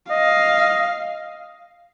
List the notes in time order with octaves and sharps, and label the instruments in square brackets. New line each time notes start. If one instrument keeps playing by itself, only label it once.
[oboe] D#5 [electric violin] F5